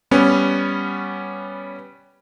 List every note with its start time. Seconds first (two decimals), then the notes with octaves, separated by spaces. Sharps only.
0.11 G3 B3 C#4